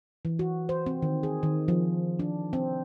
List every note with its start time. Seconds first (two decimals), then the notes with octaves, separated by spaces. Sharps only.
0.25 E3
0.39 F#4
0.69 C5
0.86 C4
1.02 D#3
1.23 G#4
1.43 D#3
1.68 F3
2.19 D4
2.53 C4